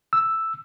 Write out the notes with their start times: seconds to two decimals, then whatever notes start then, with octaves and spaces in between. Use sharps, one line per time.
0.13 E6